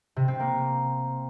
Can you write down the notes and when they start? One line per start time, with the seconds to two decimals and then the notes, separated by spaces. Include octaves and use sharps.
0.16 C3
0.28 C4
0.40 A#3